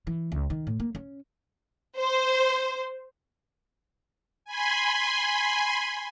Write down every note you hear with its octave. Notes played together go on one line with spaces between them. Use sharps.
E3
C#2
D#3
A2
A#3
C#4
C5
G#5 B5 C6